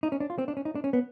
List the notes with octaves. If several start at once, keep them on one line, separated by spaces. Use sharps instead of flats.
D#4
C#4
D4
F4
C4
D4
C#4
D#4
D4
C#4
B3